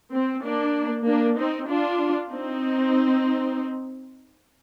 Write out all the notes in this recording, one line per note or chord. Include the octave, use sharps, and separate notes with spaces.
C4
A#3 D4
A#3 D4
C4 D#4
D4 F4
C4 D#4